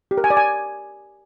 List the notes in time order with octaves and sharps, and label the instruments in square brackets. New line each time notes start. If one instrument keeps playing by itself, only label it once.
[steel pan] G4
A#4
G#5
D5
G#5